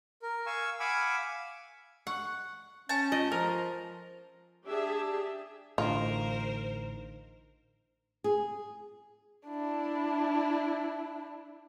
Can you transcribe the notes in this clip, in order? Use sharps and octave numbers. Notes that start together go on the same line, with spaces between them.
A#4
F5 G#5 C#6 E6
F5 F#5 G#5 B5 D6 E6
F#5 C#6
C#4 G#5 A5 G6
F4 D#5
F3 A#4
D4 G4 G#4 E5
A1 A2 D3 D#4 F4 A#4 C5 A#5
G#4
D4 E4